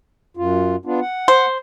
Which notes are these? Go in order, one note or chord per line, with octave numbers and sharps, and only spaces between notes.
F#2 F4
B3 D4 F4
F#5
C5